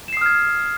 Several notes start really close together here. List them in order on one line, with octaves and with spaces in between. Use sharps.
E7 C7 D#6 F6 G#6